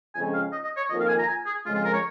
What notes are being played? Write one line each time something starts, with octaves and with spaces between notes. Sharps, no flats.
F2 C#3 G#3 C#4 G#5
F5
D#5
D#5
C#5
F2 D#3 A#3 F4 D#5
F5
G#5
A#5
G#5
G#4
F2 C#3 F3 G#3 F4
F4
A#4
C#5